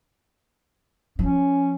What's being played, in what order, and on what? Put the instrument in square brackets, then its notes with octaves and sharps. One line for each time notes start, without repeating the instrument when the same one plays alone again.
[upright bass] F3 [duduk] C#4